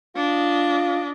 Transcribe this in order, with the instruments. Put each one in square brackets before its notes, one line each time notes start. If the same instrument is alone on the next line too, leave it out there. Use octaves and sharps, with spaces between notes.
[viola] D4 D#5 [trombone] F4